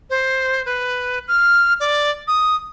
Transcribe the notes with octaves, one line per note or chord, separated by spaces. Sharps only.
C5
B4
F6
D5
D#6